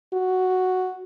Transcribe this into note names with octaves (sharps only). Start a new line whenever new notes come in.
F#4